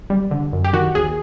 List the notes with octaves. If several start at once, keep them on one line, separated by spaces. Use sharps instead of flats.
G3
D3
F#2
G4
D#3 F#4
D#2 G#4